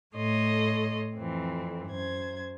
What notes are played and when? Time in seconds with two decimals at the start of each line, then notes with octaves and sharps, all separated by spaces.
0.15 A2 A4 C#5 D#5 C6
1.16 F2 E3 C4
1.87 F#2 C5 G#6